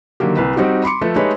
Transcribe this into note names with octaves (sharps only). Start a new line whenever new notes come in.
D3 D#3 F#3 A#3 G4
C2 B4
G3 C4 D#4 F#4 G4
B5 C6 D6 C#7
F3 A3 A4 B4
G#3 A3 D#4 G4 B4 C#5